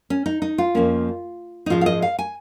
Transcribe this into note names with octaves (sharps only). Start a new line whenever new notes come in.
C#4
D#4
D#4
F4
F2 F3 A#3 C#4
D#4
G#2 F3 G#3 C#4 F4
F5
D#5
F5
G#5